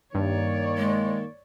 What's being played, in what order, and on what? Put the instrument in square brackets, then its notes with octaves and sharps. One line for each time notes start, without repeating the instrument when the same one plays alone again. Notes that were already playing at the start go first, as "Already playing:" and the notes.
[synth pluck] G2 [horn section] D#3 A#3 [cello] C#5 D5
[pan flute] G#3